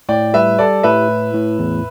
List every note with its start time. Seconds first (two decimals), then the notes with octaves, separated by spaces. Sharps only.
0.09 A2 D5 G5
0.33 G3 B4 E5
0.58 G4 A4 D5
0.83 A2 B4 E5
1.09 E4
1.34 A2
1.59 E2